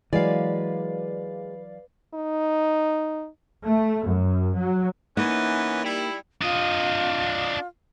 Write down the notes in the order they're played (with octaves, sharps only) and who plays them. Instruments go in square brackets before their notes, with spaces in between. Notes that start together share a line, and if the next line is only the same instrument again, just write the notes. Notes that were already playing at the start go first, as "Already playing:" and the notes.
[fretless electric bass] E3 F#3 [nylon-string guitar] G#3 [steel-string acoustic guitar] B4 [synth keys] D5 F5
[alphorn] D#4
[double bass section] A3
F#2
F#3
[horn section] E3 B3 C#4 [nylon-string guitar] A#3 D#4 E5
[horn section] G3 E4
[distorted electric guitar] D4 D#5 [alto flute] F4